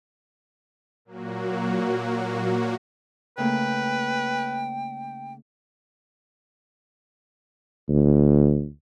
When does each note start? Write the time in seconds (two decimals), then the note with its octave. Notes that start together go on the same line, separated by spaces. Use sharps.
1.05 A#2 F#3 A#3 F#4
3.38 C#3 A3 A#3 B4 G5
7.89 D2